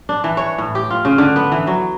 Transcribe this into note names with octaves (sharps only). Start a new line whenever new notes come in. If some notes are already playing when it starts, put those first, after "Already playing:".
D4
E3
C#5
A2
G4
F4
C#3
D3
B3
E3
F#3